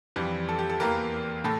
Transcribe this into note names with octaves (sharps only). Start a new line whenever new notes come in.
F2 E3 G3 G4
A4
G4
A4
E2 E3 A#3 G4 A#4
A2 A4